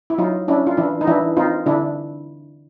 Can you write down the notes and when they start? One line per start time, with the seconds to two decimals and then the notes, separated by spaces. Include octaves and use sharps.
0.10 E4
0.18 F#3 D#4 F4
0.48 C#4 D4 E4
0.67 F4
0.77 E3 D4 E4
1.01 D#4
1.07 E3 D4 E4
1.36 C4 D#4 F4
1.66 D3 D4 E4